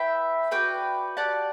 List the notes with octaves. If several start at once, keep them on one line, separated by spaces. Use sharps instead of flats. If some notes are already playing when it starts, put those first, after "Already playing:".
Already playing: E4 B4 E5 G5
F#4 B4 D5 G5
G4 D5 F#5 A5